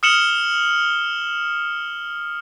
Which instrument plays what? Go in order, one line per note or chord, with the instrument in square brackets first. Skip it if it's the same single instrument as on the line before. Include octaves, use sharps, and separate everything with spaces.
[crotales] D#6 F6 C#7 E7 F#7 G7